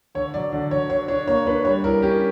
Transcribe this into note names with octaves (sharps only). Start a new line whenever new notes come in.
D3 C#5
F#3 D5
D3 D5
D3 C#5
D4 C#5
D4 C#5
A#3 C#5
D4 B4
G3 C#5
E4 A#4
C#4 G4